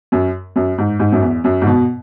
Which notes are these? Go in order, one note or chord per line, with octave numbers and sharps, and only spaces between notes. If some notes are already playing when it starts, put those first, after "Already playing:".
F#2
F#2
G#2
G#2
F#2
E2
F#2
G#2
B2